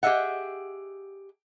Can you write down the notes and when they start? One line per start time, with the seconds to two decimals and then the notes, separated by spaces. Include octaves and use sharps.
0.03 G4 G#4 D#5 E5 F#5